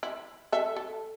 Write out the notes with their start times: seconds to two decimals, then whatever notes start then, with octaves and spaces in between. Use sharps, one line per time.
0.03 E4
0.52 A4 E5
0.76 A4